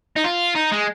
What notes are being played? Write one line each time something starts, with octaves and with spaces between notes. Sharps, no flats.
D#4
F4
D#4
G#3